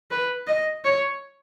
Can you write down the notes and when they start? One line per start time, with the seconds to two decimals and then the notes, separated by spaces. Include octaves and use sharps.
0.11 B4
0.47 D#5
0.84 C#5